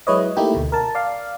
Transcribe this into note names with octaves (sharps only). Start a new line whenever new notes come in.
F#3 G#3 E4 B4 C#5 D#5
A3 A#3 D#4 E4 G4
D2 B2
A#4 A5
D5 F5